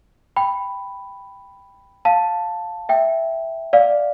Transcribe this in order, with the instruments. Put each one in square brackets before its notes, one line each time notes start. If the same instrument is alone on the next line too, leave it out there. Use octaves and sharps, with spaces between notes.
[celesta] G5 B5
F5 A5
E5 G5
D5 F5